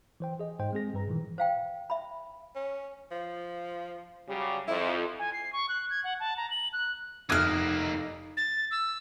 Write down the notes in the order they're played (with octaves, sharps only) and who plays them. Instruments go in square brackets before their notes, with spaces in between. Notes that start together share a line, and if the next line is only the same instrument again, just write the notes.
[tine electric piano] E3 C5 G5
G#4 D#5
G#2 C5 G5
G#3 C4 G#4 A#6
G2 G3 B4 A#5
A#2 D#3 E3
[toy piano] C5 F5 G5
E5 B5
[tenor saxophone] C#4
F3
[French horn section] C#3 F#3 G3
[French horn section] F2 [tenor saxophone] E4
[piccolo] G#5
C7
C#6
F#6
G#6
F#5
A5
A#5
F#7
F#6
[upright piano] F1 F#6 G#6 [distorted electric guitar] A#3 E4 [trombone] D#4 [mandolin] D#6 F6
[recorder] A6
E6